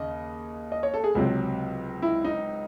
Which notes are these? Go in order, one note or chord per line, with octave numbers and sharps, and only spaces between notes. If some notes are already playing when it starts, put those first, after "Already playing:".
Already playing: D#2 C#3 D#5
D#5
C#5
A4
G#4
C#2 C3 F#3 C4
E4
D#4